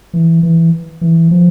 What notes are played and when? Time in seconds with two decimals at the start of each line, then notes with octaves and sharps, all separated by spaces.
0.13 E3
0.43 E3
1.01 E3
1.31 F3